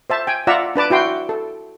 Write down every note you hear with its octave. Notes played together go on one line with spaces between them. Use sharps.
C5 E5 A5
G5 G#5
F4 D5 E5 F#5 A#5 E6
D4 B4 A5 D6
E4 F#4 G5 C6
A4